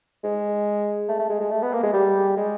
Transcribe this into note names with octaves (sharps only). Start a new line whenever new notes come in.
G#3
A3
A3
G#3
G#3
A3
B3
A#3
G#3
G3
G#3